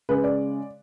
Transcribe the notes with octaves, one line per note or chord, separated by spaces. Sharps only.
C#3 G#3 B4
D5